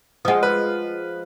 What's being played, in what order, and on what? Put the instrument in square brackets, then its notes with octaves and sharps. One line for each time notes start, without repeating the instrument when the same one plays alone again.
[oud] F3 G#3 [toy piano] F#5 D#6
[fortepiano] B4